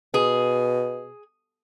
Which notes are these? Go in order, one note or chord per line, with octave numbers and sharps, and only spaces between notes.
B2 G#4